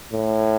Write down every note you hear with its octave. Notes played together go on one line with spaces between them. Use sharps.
A2